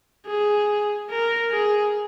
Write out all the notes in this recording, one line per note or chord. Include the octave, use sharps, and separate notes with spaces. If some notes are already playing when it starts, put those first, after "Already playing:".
G#4
A#4
G#4